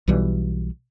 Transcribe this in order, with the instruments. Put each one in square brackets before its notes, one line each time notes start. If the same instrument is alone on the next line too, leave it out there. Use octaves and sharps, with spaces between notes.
[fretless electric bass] B1 B2 E3 G3